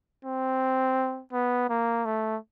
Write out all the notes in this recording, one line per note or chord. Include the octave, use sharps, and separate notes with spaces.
C4
B3
A#3
A3